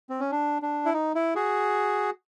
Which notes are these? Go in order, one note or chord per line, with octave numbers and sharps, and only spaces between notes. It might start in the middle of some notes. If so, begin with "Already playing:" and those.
C4
C#4
D4
D4
E4
D#4
E4
F#4 G#4